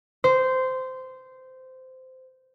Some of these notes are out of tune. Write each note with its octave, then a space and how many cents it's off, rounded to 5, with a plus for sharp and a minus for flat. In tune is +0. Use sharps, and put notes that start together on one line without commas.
C5 -15